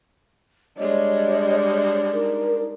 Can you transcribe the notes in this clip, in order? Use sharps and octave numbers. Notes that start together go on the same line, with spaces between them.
G3 G#3 D4 C#5 D#5
D#4 A#4